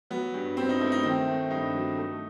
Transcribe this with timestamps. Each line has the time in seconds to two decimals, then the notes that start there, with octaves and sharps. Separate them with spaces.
0.10 F#3 B3
0.34 G2
0.57 G2 C4
0.69 D#4
0.81 A3 E4
0.92 D#4
1.03 D#3 C4
1.27 A3
1.50 G2 D#4
1.74 F#3
1.97 A3